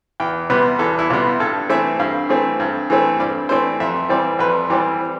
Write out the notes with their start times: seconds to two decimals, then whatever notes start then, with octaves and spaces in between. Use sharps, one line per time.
0.20 E2 G5
0.50 C3 G3 B3 B4
0.79 E2 A4
0.99 E4
1.10 C3 G3 B3 F4
1.40 G2 A4
1.69 E3 A3 C4 E5
2.00 G2 F5
2.29 E3 A3 C4
2.60 G2
2.90 E3 A3 C4
3.20 G2 D5
3.49 E3 A3 C4 C5
3.80 F2 E5
4.09 E3 G3 C4 D5
4.39 F2 B4
4.70 E3 G3 C4 G4